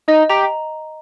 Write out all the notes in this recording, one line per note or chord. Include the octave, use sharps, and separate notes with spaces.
D#4 D#5
G4 A#5